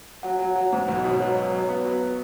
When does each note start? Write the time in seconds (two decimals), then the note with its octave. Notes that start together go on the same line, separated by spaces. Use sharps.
0.23 F#3 F#5
0.39 F#3
0.56 F#3
0.73 G#2
0.88 B1 F#5
0.98 D#5
1.04 B2 C#5
1.20 F#3 B4
1.36 F#3
1.52 F#3
1.69 B3
1.85 F#3 B4